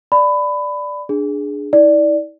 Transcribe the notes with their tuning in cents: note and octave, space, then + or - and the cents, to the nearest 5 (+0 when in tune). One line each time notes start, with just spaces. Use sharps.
D5 +0 B5 +20
D4 +0 G#4 +0
E4 -45 D5 +0